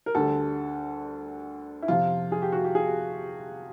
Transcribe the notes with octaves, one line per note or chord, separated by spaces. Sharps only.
A#4
D2 D3 G3 A4
E4
F2 C3 F3 F4
G#4
G4
F#4
G4
G#4